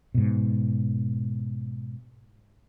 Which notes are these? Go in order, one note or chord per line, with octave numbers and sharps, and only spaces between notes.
G#2 B2